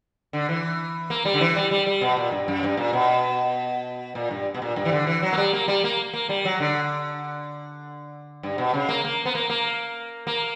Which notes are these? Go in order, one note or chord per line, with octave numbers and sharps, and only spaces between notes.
D3
E3
A#3
G3
D3
E3
G3
G3
G3
B2
A#2
G2
F#2
G2
A#2
B2
A#2
G2
B2
A#2
G2
E3
D3
E3
F#3
A#3
G3
A#3
G3
A#3
A#3
G3
F#3
D3
G2
B2
C#3
A#3
A#3
B3
A#3
A#3
A#3